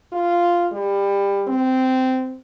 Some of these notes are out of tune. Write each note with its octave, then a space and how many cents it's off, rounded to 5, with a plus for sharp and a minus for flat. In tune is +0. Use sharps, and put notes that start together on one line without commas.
F4 -5
G3 +25
C4 -15